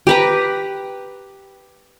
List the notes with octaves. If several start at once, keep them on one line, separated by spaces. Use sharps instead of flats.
G4 B4 A#5